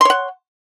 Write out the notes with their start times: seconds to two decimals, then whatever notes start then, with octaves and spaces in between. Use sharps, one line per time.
0.01 C6
0.05 C#5
0.10 F#5